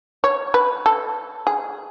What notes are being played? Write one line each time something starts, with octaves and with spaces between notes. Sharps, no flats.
C#5
B4
A4
G#4